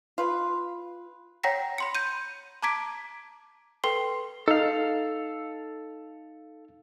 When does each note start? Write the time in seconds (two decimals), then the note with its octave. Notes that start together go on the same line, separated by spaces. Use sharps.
0.18 F4 B4
1.43 C#5 F#5 G5 A#5 A#6 B6
1.78 B5 C6 C#7
1.95 G6 D#7
2.62 A5 A#5 D6 G#6 B6 D7
3.84 A4 B4 G5 C6 C7 G7
4.48 D#4 A4 F5